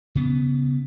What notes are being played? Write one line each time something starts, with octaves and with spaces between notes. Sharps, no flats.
C#3 B3